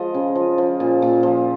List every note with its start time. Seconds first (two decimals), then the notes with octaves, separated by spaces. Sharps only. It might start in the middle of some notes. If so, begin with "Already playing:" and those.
Already playing: F3 G#3 D#5 F5
0.14 C#3
0.35 F3
0.58 F3
0.80 A#2
1.02 A#2
1.23 F3